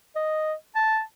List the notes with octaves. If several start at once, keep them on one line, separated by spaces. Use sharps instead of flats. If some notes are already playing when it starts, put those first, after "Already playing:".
D#5
A5